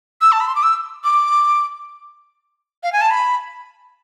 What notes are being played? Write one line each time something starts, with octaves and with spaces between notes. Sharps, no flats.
E6
A5
B5
C6
D6
E6
D6
F5
G#5
A5
B5